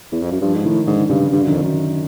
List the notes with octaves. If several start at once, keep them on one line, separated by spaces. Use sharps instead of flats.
E2
F2
F#2
G2 F3
G#2
A2 D#3
G#2 D3
G2 C#3
G2 D3
F#2
D#3
F2
F#2 D#3